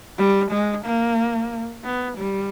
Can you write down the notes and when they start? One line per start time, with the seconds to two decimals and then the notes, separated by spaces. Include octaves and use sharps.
0.18 G3
0.51 G#3
0.85 A#3
1.85 B3
2.17 G3